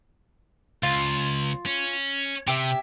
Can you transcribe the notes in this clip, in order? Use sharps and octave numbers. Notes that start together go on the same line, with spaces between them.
C#2 F4
C#4
C3 G4 E5